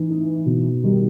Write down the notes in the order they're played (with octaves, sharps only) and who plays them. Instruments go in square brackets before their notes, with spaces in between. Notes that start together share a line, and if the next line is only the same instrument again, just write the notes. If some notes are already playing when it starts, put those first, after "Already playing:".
Already playing: [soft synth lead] E3 [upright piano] D#4
[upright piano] D#4
B2
[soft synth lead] D#3 [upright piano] G3